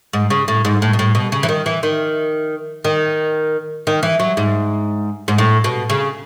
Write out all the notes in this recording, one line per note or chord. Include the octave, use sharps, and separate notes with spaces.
G#2
C#3
A2
G#2
A2
B2
A2
B2
C#3
E3
D#3
E3
D#3
D#3
D#3
E3
F#3
G#2
G#2
A2
B2
C#3